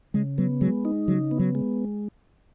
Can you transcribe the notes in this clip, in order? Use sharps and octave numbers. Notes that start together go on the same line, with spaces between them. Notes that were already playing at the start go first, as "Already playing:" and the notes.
C#3 G#3
F#3 B3
F#3 G#3
D#4
C#3 F#3
B3
F#3
G#3